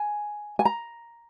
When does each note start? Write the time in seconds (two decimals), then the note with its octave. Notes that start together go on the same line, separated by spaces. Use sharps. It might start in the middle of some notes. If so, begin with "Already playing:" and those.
Already playing: G#5
0.59 G#5
0.65 A#5